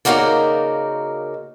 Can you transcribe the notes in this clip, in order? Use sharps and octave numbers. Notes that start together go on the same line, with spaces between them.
C#3 A#3 D#4 F#4 A#4 D5